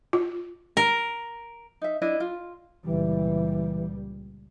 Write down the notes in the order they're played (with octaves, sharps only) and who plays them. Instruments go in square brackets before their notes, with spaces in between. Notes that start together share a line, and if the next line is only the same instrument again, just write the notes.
[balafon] F4
[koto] A#4
[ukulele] D#4 E5
D4 E4 D#5
F4
[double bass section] C#2 A#2 G3 [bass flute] E3